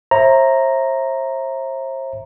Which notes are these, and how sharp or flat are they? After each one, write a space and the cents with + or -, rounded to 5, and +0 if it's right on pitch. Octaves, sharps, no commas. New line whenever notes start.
C5 +40 E5 +0 A#5 +0